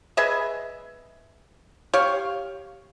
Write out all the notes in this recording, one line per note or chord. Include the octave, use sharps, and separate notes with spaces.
G#4 B4 D#5 E5
G4 C#5 F5